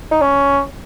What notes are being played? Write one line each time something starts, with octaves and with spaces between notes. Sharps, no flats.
D#4
C#4